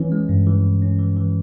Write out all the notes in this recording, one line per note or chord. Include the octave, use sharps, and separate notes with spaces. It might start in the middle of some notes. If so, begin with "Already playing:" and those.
Already playing: E3 C#4
G#3
G2
E3
G2
C#4
E3
E3